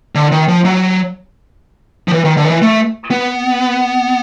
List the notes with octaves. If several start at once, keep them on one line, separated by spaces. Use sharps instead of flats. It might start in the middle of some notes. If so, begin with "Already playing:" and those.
D3
D#3
F3
F#3
F3
E3
D#3
D3
D#3
E3
A3
B3